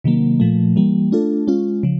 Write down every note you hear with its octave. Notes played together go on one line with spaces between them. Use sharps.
C3 D#3 F#3 A#3
A#2 F3 A3
E3 G3 A#3
A3 D4 F4 A4
G#3 C#4 F4
C#3 F3